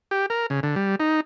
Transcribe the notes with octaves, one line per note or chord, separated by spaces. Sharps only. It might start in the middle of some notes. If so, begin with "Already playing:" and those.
G4
A#4
C#3
D3
G3
D#4